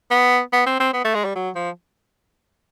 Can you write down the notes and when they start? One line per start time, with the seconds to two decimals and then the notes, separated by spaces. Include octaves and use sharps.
0.11 B3
0.53 B3
0.67 C4
0.80 C4
0.93 B3
1.05 A3
1.15 G#3
1.25 G3
1.35 F#3
1.55 F3